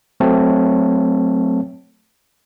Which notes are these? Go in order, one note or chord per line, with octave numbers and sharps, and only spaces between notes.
F#3 A3 C4 C#5 A5